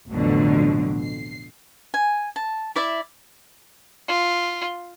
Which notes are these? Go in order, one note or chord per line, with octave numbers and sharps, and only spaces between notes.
A1 F2 B2 D3 F#3
C7
G#5
A5
E4 D5 E5
F4